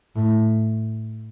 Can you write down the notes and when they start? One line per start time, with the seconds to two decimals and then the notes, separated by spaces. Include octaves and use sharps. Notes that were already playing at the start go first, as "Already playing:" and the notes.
0.16 A2